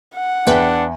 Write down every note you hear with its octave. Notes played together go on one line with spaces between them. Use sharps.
F#5
E2 D4 B4 G5